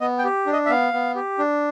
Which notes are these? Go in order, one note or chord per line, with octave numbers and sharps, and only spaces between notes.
B3 D#5
G5
G4
D4
D#5
E5
B3 F5
B3
G4
D4